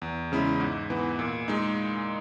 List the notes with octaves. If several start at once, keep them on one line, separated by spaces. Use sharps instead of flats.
E2
C#3 G#3 C#4 E4
G#2
E3 B3
A#2
G#3 D#4